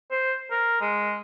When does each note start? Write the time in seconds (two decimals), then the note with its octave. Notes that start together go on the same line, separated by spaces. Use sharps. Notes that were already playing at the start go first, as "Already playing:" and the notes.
0.11 C5
0.51 A#4
0.81 G#3